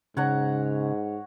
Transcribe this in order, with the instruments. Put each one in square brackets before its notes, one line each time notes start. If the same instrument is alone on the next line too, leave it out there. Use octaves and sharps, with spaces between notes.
[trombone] G#2 [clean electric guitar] C#3 [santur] C#5 F#5 A#5